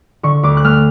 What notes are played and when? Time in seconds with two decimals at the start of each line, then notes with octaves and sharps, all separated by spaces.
0.23 D3 C#6
0.43 D2 D6
0.57 F#6
0.64 A3 F6